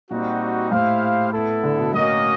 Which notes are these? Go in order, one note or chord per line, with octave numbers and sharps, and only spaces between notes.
A#2 G3 C4 D#4 F#4
A2 E4 G4 C5 F5
B3 E4 A4
D3
B2
A2 A#3 C#4 F#4 A#4 D#5